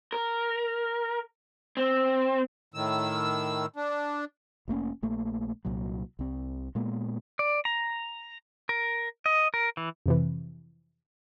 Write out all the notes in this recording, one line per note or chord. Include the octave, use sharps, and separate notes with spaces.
A#4
C4
A2 D#3 E6
D4
F1 A3 A#3 C#4
A#1 A3 A#3
C2 A#2 F#3
C2 C4
A#2 G#3 A#3 B3
D5
A#5
A#4
D#5
A#4
E3
F2 C3 E3